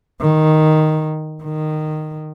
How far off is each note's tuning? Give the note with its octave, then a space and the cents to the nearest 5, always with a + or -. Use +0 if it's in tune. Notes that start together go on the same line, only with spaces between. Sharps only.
D#3 +0
D#3 -10